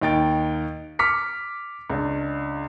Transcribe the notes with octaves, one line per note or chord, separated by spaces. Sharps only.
D#2 D#4 G5 A6 D7
D6 F6 B6 C#7
C#2 D4